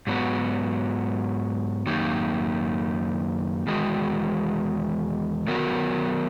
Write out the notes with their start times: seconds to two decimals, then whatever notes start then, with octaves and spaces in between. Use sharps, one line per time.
0.07 G#2 F#3 B3 F#4
1.86 F#2 D#3 A#3 D#4
3.67 E2 D#3 G#3 F#4
5.47 D#3 F#3 B3 F#4 A#4